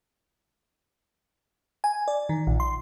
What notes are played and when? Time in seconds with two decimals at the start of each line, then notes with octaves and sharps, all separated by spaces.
1.84 G#5
2.08 D5
2.29 D#3
2.47 A#1
2.60 C6